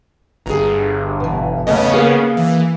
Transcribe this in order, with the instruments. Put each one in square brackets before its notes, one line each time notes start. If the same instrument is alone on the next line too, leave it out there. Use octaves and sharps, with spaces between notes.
[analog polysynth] G1 [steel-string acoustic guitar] G#4 A#5
[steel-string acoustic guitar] B2 E3
[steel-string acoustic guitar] E2 A3 D#5 [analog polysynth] C#3 B3 C#4
[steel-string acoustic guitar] A#3 G#4 F5
[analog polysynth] E3